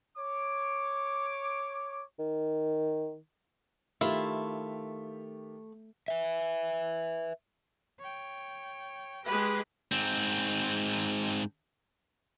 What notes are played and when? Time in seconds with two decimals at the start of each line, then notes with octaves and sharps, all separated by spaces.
0.18 C#5 D6
2.19 D#3
4.01 D#3 A3 E4 F4 G4
6.08 B4 E5
7.99 C#5 G5
9.25 G#3 G4 G#4 B4
9.92 G#2 C4